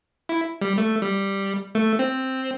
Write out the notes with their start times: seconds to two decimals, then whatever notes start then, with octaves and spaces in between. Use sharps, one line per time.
0.29 E4
0.61 G3
0.78 A3
1.02 G3
1.75 A3
1.99 C4